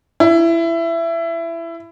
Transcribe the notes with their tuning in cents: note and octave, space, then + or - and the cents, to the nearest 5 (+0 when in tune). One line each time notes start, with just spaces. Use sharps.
E4 +20